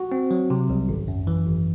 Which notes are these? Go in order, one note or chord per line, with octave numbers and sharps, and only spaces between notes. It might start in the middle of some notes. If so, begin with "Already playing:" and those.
Already playing: F#4
C4
F#3
C3
C2
G#1
F#2
E3
G#1